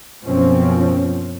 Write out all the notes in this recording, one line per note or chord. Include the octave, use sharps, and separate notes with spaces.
F#2 B2 F3 C4 C#4